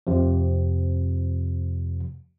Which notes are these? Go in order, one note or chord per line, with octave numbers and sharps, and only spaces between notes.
F2 C3 F3